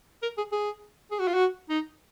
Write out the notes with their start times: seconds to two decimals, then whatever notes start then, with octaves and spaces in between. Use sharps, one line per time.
0.23 A#4
0.37 G#4
0.52 G#4
1.11 G#4
1.19 F#4
1.27 F4
1.34 F#4
1.70 D#4